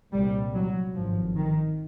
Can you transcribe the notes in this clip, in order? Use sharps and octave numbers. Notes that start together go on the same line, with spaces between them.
C2 A#2 G3
F#3
G#1 G2 F3
D#3